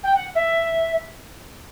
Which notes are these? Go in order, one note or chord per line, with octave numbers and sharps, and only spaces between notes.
G5
F#5
E5